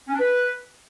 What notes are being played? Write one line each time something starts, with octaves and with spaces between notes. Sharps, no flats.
C#4
D4
B4